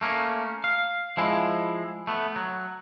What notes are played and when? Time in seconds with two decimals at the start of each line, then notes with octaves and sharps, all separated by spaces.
0.01 A3 A#3 C#4
0.64 F5
1.17 F3 G#3 E4
2.07 A3 B3
2.36 F#3